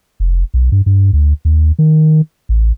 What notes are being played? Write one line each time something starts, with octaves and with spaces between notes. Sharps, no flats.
F1
B1
G2
G2
D2
D#2
D#3
A1